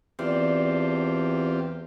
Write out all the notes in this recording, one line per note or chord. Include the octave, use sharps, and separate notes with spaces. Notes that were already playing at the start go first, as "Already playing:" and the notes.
E2 C4 D4 F4 G4